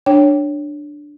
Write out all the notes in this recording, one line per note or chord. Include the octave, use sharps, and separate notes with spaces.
D4 C#5 G5